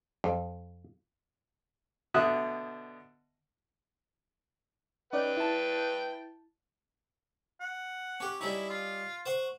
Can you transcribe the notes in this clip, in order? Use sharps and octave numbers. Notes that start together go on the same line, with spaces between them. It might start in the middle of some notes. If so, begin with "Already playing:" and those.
F2
B2 D3 E5 D#6 F#6
C#4 D#4 B4 D5 G5
E4 A5
F#5
C#4 G4
G3 C#4 D#4 E4
F4
C5 F#5 C#6